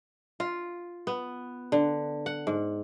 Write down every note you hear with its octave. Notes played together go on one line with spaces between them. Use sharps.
F4
B3
D3
F#5
G#2